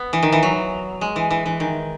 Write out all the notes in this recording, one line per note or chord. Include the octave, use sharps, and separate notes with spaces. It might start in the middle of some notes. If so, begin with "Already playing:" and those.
Already playing: B3
E3
D#3
E3
F#3
G#3
E3
E3
E3
D#3